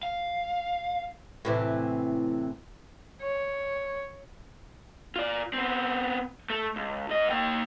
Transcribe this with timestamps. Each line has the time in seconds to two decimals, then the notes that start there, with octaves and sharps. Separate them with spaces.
0.03 F5
1.45 A2 C3 E3
3.22 C#5
5.16 F4 D5
5.54 B3 C4
6.50 A3
6.76 C#2
7.09 G#2 D#5
7.30 A#3 G5